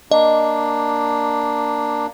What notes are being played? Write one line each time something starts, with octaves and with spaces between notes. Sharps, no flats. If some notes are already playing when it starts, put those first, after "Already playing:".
A#3 D4 D#5